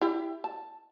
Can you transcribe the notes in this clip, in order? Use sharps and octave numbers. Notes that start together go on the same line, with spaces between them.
E4 G4
A5